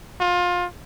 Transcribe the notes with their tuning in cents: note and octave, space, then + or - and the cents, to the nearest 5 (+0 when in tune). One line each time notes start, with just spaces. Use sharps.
F4 +25